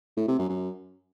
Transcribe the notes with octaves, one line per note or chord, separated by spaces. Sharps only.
A2
C3
F#2
F#2